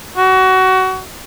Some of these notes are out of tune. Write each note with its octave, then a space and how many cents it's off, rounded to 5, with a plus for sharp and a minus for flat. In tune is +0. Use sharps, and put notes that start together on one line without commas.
F#4 +25